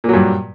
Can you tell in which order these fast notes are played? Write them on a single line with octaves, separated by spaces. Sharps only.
A#2 F#3 G2